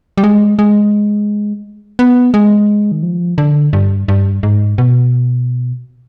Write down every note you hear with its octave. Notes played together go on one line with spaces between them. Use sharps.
G3
G#3
G#3
B3
G#3
D#3
F3
D3
G2
G2
G#2
B2